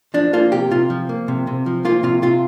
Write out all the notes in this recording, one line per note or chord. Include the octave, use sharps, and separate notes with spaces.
F3 D4
A#3 F4
C3 G4
C3 F4
F3
A#3
C3
C3
F3
A#3 F4
C3 F4
C3 F4